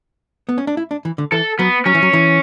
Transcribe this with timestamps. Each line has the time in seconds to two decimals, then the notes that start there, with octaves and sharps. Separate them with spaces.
0.49 B3
0.58 C#4
0.67 D4
0.77 E4
0.91 D4
1.05 E3
1.18 D3
1.32 E3 A4
1.59 F#3 B3
1.85 F#3 C#4
1.95 E3
2.02 F#3
2.13 E3